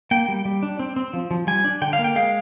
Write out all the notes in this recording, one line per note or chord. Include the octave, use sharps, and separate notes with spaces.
A#3 G5
G3
G3
D4
C4
C4
F3
F3
G3 G#5
D4
D3 G5
F5
A#3
G5
G#3 F5